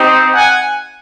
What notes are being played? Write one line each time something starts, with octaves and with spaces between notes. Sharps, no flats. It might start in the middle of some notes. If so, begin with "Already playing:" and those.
Already playing: C4 D#4 G4
F#5 G#5